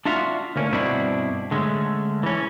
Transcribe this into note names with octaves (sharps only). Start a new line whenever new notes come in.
D4 F4 F#4 E5 F5
D2 A#3 C#4
G2 B2 C4 D4 E4 F#4
D3 G#3 A3 C#4
E3 C#4